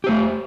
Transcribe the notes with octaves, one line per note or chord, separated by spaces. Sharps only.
A3 G4 C5